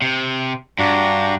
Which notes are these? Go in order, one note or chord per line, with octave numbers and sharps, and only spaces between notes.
C3
G2 D4 F#4 A#5